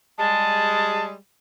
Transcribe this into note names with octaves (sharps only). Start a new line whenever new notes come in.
G3 G#3 A5